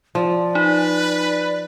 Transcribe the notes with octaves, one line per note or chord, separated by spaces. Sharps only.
F3 D5
D#4 B4